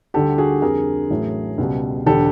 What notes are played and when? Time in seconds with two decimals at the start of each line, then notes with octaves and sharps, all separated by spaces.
0.14 D2 D3 G3 G4 A4
0.38 F#4 G#4
0.62 F2 D3 G3 G#4 A#4
1.10 A1 A2 F#3 A3
1.58 C#2 B2 G3
2.06 E1 D3 G4 A4